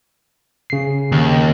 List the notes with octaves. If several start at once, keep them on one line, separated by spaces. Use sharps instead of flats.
C#3 C7
D#2